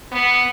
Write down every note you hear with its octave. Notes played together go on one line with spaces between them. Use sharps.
B3